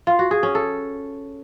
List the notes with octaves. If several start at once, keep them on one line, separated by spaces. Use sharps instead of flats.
F4
F#4
G#4
C#4
A4